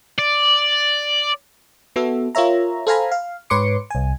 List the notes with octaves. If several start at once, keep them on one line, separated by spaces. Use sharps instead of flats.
D5
B3 F#4 A4 E5
F4 A#4 C#5 E5 A#5
A4 C5 F5 G#5 A#5 B5
F5
G#2 B4 C#5 C6 D6 C#7
C2 G#5